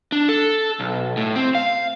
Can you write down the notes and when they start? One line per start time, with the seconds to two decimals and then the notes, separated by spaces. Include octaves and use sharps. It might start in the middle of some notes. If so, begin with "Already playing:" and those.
0.12 D4
0.29 A4
0.80 B1
1.17 A2
1.36 C4
1.55 F5